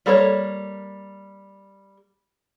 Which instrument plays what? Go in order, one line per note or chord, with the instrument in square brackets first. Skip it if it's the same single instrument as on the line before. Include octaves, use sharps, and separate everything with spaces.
[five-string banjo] G3 A#3 A4 C5 C#5